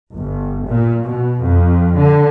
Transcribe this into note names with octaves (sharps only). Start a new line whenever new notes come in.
G1
A#2
B2
F2
D3